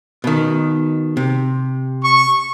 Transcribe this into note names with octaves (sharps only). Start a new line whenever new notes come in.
B2 D#3
C3
C#6